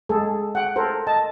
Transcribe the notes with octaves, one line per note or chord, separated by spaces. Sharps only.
G#3 G#4 A4
F#5 G5
A4 A#4 C5
D#5 A5